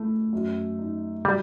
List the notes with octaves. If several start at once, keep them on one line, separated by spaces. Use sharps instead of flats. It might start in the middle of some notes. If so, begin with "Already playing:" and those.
Already playing: A3 E4
F#2
D#4
F#3 G3